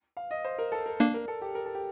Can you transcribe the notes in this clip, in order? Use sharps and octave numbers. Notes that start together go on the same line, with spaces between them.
F5
D#5
C5
A#4
A4
A#4
A#3 D4 D5
A#4
A4
G4
A#4
A4
G4